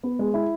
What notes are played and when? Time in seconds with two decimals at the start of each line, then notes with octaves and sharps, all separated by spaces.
0.03 B3
0.19 G#3
0.34 E4